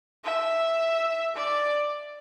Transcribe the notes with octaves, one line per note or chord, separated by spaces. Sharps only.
E5
D5